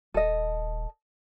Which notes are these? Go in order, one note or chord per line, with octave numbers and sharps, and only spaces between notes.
D#1 A4 D#5